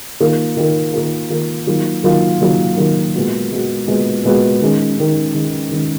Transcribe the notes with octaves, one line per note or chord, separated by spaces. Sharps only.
D#3 A#3 F4 A#4
D#3 A#3 F4 A#4
D#3 A#3 F4 A#4
D#3 A#3 F4 A#4
D#3 F#3 A#3 F4
D#3 F#3 A#3 F4
D#3 F#3 A#3 F4
D#3 F#3 A#3 F4
A#2 G#3 B3 F#4
A#2 G#3 B3 F#4
A#2 G#3 B3 F#4
A#2 G#3 B3 F#4
D#3 G#3 C#4
D#3 G#3 C#4
D#3 G#3 C#4
D#3 G#3 C#4